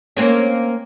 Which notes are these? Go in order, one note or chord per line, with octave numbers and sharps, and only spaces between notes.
A#3 C4 C#4